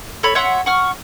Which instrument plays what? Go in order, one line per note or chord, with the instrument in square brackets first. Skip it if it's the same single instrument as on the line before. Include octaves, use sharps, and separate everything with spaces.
[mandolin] A4 C#5 B5
C#5 E5 F#5 C6
F#5 C#6 F6